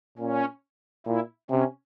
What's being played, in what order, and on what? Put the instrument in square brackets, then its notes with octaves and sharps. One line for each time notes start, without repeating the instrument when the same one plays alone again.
[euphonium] A#2 [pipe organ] C#4
[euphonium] A#2 [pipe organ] E4
[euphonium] C3 [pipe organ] C#4